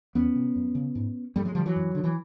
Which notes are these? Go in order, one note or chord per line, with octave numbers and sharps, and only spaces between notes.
E2 B3 C#4
C3
F#2
C#3
G#2
G2 G3 A3
F#3 G#3
D3 F3 G3
E3 F#3
F#2
D3
E3